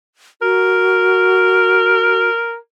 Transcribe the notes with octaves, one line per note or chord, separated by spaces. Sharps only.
F#4 A#4